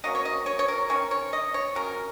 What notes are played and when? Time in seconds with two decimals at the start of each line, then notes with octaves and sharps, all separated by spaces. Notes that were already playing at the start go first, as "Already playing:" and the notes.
0.04 F#3 A#3 C#4 D#5
0.15 C#5
0.25 D#5
0.46 C#5
0.59 C#5
0.68 A#4
0.89 D#3 G#3 C#4 C#5
1.11 C#5
1.33 D#5
1.54 C#5
1.75 F#3 C#4 A#4